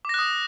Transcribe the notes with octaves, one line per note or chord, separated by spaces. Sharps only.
D6 D#6 F#6 A#6